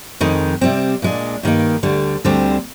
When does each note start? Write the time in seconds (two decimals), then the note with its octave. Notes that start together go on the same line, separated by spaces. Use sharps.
0.21 F2 D#3 G#3 D#4
0.61 C3 G3 C4
1.02 A#2 G#3 D4
1.43 G2 D#3 A#3 D#4
1.83 D2 D3 G3
2.25 D2 D3 G3 C4